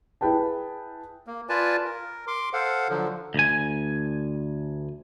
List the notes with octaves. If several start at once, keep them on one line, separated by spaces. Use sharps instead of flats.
E4 G#4 B4 G5 A5
A#3
F4 B4 D5 G#5 A5
A#4
C6 D6
A4 C5 F5 F#5
D3 F3 F#3
D2 G#5